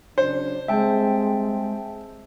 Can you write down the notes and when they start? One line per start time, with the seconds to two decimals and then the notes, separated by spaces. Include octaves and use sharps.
0.18 C#3 F#3 D4 C5
0.68 G3 G#3 C4 E5 G5 A5